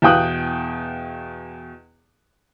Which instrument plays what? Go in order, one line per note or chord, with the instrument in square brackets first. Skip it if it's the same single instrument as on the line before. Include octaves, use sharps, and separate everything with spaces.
[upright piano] E2 B2 F5 G5 D#6 F#6